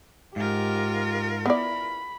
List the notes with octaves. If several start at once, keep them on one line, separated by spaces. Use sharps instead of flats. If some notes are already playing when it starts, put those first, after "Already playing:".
G#2 F4 G4 A#4
B3 E4 D5 B5